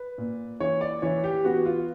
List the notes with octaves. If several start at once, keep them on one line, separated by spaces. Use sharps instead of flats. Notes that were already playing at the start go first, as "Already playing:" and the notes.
Already playing: B4
A#2
E3 C#5
D5
E3 C#5
G4
B3 F#4
F4